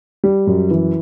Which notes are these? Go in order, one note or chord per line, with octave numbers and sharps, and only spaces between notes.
G3
F#2
E3